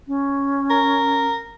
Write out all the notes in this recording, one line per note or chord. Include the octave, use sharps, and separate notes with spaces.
C#4
A#4